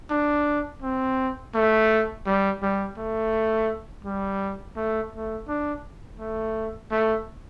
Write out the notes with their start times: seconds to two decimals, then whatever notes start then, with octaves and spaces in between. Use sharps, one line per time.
0.11 D4
0.82 C4
1.54 A3
2.26 G3
2.62 G3
2.97 A3
4.05 G3
4.76 A3
5.12 A3
5.48 D4
6.19 A3
6.91 A3